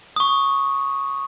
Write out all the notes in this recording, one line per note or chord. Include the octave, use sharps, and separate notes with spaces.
C#6 D#6